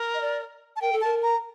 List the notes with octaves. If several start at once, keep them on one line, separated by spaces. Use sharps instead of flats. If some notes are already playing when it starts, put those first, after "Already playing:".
Already playing: A#4
D#5
D5
A5
A#4 G5
A4
A#4 A5
A#5